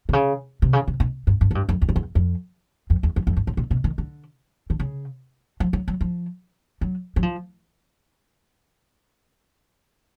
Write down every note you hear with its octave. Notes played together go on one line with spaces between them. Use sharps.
C3
C#3
C3
C#3
C3
B2
G2
G2
G#2
G2
F2
E2
F2
E2
F2
F2
E2
F2
F2
G2
A2
A#2
B2
D#3
D3
D3
C#3
F3
F#3
F#3
F3
F#3
F#3
F3